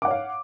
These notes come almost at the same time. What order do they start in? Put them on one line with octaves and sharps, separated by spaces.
D6 F#5 C#5 F5